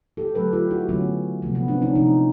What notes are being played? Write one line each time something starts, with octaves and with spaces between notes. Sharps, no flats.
G4 A4
D3 F#3 A3 A4 B4
F4 G4
E4 F#4
D3 F#3 A3 B3 C#4
C3 F3 A3 B3
B3
C4 D4
C#4 D#4
C3 F3 A3 C#4 D#4